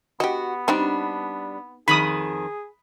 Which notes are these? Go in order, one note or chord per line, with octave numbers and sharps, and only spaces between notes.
B3 F#4 G4 D#5
G3 C4 D4 D#4 G4
F2 D#3 G#4 B5 D#6